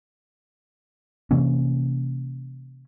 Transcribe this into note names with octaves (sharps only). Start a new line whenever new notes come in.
C3 E3 A#3 C#4